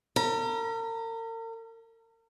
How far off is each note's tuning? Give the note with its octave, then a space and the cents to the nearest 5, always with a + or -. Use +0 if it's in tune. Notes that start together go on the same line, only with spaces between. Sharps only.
A#4 -40 A#5 +45